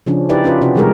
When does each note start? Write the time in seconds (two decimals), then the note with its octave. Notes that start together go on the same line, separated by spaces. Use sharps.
0.06 C#3 F3 C#4 D4
0.29 D#4 E4 G4 B4 D5
0.44 C#4 F4 B4
0.61 C3 C#4 F#4 D5
0.75 B2 E3 G3 G#3 G#4 A#4